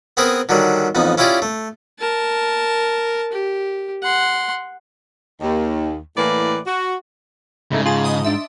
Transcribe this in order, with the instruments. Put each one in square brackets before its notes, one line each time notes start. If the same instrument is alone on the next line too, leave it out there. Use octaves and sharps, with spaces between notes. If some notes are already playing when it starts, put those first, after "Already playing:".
[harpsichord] B3 C4 G#4 A#4 B4
D3 D#3 F#3 G3
A1 F2 B3 D#4
C#4 E4 F4 G4 G#4 D5
A3
[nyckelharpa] A#4 A5
G4
F#5 C6
[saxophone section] D#2
A2 E3 A#3 B4 D5
F#4
[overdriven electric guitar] G#2 [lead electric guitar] C#3 [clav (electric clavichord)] A3 D#4 E4
[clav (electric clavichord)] F4 G#4 [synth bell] A5 F#7
[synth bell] D#5 C6 D#6
D4 E5